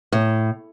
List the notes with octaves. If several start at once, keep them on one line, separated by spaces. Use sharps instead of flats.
A2